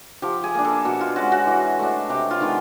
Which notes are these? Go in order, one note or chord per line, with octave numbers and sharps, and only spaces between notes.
F3 G4
G#4
A#3 D4
A4
B2 F#4
F4
G#3 C#4 F#4
F#4
E3
A3 D4
C3 G4
F4
D#3 G#3 B3